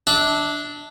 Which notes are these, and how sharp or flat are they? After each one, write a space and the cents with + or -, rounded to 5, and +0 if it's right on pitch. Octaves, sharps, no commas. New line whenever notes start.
D4 +0 E5 -35